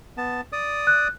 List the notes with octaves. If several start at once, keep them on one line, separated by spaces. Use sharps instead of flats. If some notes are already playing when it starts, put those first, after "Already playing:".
B3 A5
D5 D#6
F#6